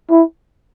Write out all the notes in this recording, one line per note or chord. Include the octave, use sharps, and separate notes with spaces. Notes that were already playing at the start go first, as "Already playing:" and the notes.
E4